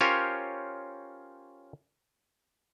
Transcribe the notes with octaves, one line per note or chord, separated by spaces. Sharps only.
C#4 F4 G4 A#4 C5 C#5